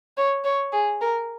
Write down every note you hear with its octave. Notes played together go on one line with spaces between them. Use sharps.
C#5
C#5
G#4
A#4